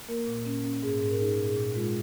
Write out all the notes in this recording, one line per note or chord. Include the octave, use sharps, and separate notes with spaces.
A#3 A#4
A#2
C#4
C#4
G#2 G#4
G#2 G#4
A#4
D#4 G#4
A#2
G#4
A#2
G#3 F4